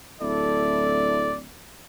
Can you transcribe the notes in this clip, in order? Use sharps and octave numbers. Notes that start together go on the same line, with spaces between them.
D1 E4 A4 D5